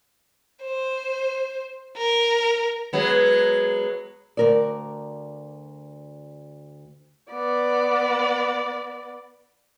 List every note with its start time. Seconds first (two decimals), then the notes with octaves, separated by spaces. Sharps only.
0.64 C5
1.97 A#4
2.93 F#3 G#3 B3
4.37 D2 A#4 D5
7.32 B3 D5